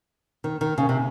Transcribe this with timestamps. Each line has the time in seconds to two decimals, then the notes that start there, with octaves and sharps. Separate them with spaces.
0.44 D#3
0.61 D#3
0.78 C#3
0.89 C3